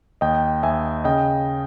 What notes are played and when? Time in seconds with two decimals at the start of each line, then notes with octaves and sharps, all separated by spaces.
0.21 D#2 D#5 G5
0.63 D#2 E5 G#5
1.04 C#3 D#5 G5